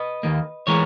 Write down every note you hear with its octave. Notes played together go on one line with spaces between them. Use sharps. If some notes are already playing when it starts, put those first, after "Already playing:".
Already playing: B4 D#5
D#2 D#3 A#3
E3 G#3 B3 A#4 C#5